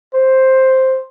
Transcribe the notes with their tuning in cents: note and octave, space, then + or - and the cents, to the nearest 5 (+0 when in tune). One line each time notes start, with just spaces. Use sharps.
C5 +5